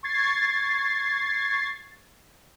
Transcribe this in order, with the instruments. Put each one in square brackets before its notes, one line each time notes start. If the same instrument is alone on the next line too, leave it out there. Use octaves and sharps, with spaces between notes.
[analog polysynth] C#6 G#6 A6 C7